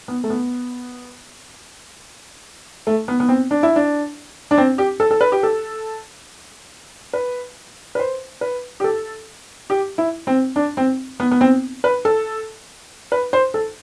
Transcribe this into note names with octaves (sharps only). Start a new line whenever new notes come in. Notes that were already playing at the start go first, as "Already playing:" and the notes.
B3
A3
B3
A3
B3
B3
C4
D4
E4
D4
D4
C4
G4
A4
A4
B4
G4
A4
B4
B4
C5
B4
G4
A4
G4
E4
C4
D4
C4
B3
B3
C4
B4
A4
B4
C5
A4